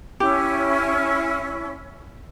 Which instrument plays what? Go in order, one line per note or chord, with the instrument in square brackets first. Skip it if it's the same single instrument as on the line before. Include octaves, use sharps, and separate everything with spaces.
[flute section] C#4 E4 [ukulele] G4